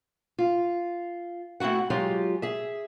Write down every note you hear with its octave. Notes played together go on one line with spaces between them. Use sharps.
F4
A3 C4 E4 F#4 F#5
F#3 G#3 F4 G4
G#4 E5